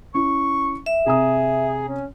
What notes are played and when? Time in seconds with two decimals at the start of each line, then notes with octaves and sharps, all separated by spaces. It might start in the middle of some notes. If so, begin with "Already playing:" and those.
0.15 C#4 E4 C#6
0.86 E5
1.06 C3 G#4 A#5 D#6
1.88 C#4